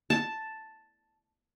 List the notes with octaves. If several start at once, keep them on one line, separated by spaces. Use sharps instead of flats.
A5